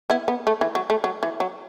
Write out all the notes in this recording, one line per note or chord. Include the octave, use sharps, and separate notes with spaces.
B3 E4
B3
A3
E3
F#3
A3
F#3
E3
F#3